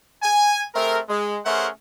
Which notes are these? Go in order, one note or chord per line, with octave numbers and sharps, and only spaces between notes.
G#5
A3 C4 G#4 A#4
G#3
A3 C#4 G#4 A#4 C5 F#5